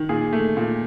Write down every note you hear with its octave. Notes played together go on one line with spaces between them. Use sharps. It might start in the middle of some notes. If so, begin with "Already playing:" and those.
Already playing: D#3
A#2 G#4
A3
A#2